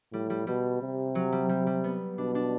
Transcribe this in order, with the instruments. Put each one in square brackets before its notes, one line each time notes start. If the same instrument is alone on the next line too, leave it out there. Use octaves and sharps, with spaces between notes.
[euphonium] A2 [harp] G3
[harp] G3
[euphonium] B2 [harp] G3
[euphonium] C3
[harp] F#3
G3
G3
G3
B3
[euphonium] B2 [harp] D4
[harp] D4